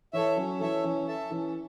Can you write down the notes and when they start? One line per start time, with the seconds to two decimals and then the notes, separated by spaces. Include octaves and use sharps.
0.13 E3 A4 C#5 E5
0.37 F#3 C#4
0.60 E3 A4 C#5 E5
0.83 E3 C#4
1.07 A4 E5 A5
1.30 E3 C#4